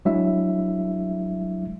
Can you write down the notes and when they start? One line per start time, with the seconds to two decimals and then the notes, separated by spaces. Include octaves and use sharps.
0.05 F#3 G#3 D4 E4 E5